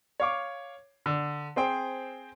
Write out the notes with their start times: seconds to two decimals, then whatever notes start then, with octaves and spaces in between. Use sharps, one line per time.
0.20 C#5 F5 D6
1.06 D3
1.56 C4 G#4 C5 G5